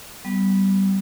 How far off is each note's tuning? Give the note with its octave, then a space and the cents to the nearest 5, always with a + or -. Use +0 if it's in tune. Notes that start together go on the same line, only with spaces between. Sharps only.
G3 -20 B3 +5